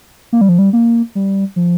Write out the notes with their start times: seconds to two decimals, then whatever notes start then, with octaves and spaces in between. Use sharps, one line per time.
0.33 A#3
0.41 G3
0.49 F3
0.59 G3
0.73 A#3
1.15 G3
1.56 F3